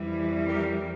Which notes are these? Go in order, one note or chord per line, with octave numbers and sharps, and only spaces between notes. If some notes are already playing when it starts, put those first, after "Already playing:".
Already playing: F2 E3 G3
G4 A#4